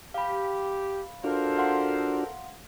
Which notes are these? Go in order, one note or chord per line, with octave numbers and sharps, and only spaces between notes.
G4 F5 B5
D4 F4 F#4 A4 A#4 C5
F5 F#5 C6